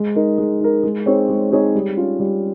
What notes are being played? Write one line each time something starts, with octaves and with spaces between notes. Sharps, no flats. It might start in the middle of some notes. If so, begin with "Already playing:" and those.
Already playing: G#3
D#4 A#4
G#3
D#4 A#4
G#3
C4 D#4 G#4 C#5
G#3
C4 D#4 G#4 C#5
G3
C#4 F4
G3